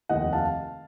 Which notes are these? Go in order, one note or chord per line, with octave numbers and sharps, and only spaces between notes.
F1 D#2 D#3 D#5 F#5
F5 A5